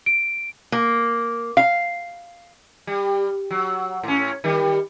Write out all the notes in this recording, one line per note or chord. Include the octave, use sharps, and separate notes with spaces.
D7
A#3
F5
G3
F#3
A2 C#4
D#3 G3